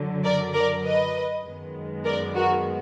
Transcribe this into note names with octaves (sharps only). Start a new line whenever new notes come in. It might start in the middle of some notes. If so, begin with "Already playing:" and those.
Already playing: F#2 D3 F#3
A#4 D5
A#4 D5
B4 D#5
F#2 D#3 G#3 B3
A#4 D5
F#4 A#4